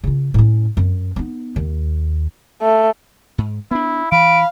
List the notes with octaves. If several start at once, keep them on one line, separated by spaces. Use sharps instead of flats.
C#3 F4
A2 C#4
F#2
B3 D#4
D#2
A3
G#2
B3 D4 E4
E3 F5 B5 D7